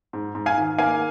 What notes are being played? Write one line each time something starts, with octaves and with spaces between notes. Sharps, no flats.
G#2
G#2
F5 G#5
D#3
A#3 F5 G#5